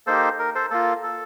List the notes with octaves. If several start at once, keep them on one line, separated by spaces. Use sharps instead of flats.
A#3 D#4 G4 A4 C5
A#4
A4 C5
A#3 F4 A4
A4